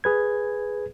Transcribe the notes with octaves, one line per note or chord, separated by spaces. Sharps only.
G#4 B4 G#6